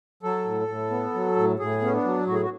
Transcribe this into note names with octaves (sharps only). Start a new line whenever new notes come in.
F#3 A4
A2
A2
B3
F#3
A2
A2 G#4
B3 C#4
D4
F#3
A2 F#4
G#4
F#4